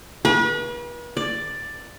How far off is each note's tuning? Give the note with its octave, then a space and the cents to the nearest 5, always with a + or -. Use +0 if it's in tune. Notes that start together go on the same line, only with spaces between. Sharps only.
B4 -40
D5 +5